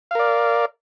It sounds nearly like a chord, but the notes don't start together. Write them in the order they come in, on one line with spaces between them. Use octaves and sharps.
F5 A#4 D5